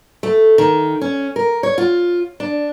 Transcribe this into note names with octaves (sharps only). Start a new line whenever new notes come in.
A3
D#3
C#4
A#4
C#5
F4
D4